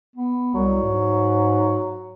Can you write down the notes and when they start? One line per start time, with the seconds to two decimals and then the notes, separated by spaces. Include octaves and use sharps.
0.16 B3
0.55 C2 F#3
0.82 G#2